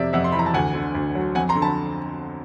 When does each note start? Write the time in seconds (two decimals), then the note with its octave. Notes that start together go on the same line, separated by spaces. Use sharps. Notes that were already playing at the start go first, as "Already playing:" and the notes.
Already playing: F2 C3 D5 E5
0.13 F2 E5 F#5
0.24 C6
0.32 E3 B5
0.39 A#5
0.46 A5
0.54 D2 F#5 G#5
0.75 D3
0.95 D2
1.15 F#3
1.35 F2 F#5 G#5
1.49 A#5 C6
1.55 D3
1.62 A5 B5